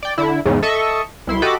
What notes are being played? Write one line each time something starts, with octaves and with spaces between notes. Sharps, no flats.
D5 G5
D3 E4
E2 G#2 C#3
A4 D#5 E5 C#6
C2 E4 C6
F#4 G4 A4 D#5 B5 D6